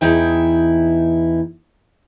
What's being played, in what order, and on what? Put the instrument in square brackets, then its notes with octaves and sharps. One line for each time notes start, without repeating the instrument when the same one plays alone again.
[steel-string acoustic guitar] E2 D#4 E4 G5